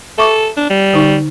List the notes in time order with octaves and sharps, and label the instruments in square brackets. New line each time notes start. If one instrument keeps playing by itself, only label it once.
[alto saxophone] A4 [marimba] E5 C#6 D6
[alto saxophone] D4
G3
[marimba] D3 D#4